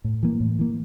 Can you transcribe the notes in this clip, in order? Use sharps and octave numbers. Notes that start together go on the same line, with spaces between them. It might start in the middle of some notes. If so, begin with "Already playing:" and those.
A2
E3 A#3
A2
E3 A#3